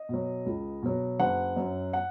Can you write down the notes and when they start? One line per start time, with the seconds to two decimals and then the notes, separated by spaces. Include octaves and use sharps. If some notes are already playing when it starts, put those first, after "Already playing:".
Already playing: D#5
0.09 B2 F#3
0.46 C#2
0.83 B2 F#3
1.19 F#1 F#5
1.56 F#2 F#3
1.93 F#5